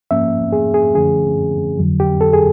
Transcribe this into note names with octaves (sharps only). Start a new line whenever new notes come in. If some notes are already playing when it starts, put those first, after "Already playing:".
G#2 F3 A#3 C#4 E5
G#4
G#4
F#2 D3 F3 A3 C#4 G#4
F2 D3 F#3
G4
A4
G#4